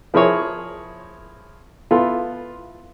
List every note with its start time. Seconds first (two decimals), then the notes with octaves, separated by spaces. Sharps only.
0.14 F3 E4 G#4 A#4 C#5
1.91 B3 E4 F4 A4